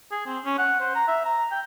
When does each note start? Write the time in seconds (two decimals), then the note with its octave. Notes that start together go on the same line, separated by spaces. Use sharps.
0.11 G#4
0.26 C4
0.45 C#4
0.58 F#5
0.80 C5
0.95 A#5
1.08 E5
1.25 A#5
1.51 G5